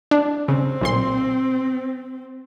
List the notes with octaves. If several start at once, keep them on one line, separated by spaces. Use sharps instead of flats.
D4
C#3 C4
B1 A#2 C6